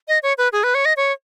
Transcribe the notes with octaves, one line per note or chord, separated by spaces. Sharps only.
D#5
C#5
B4
G#4
B4
C#5
D#5
C#5